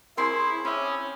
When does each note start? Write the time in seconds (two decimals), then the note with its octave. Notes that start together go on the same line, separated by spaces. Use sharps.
0.17 C4 E4 G#4 A#4 C#5 C6
0.65 C#4 E4 E5 D6 D#6